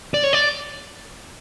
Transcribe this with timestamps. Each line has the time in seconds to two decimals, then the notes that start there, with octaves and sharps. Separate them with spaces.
0.14 D5
0.24 C#5
0.33 D5